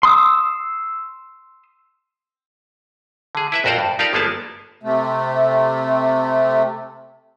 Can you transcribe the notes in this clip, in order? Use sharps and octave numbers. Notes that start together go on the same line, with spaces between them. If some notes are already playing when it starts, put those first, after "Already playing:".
C6 D#6 E6
D3 G#4
E4 B4 E5
A#1 F2 F#4 A#4 C5 D5
G2
D#4 F4 G4 A4 A#4 D5
G1 F3 A#3 B3 G#4 A5
C3 A3